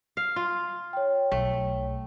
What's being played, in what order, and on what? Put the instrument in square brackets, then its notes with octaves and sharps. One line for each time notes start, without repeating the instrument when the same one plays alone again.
[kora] F5
F4
[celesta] C#5 G5
[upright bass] B1 [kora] A3